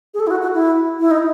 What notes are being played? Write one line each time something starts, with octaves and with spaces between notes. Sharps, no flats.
G#4
A4
E4
F#4
F#4
E4
E4
D#4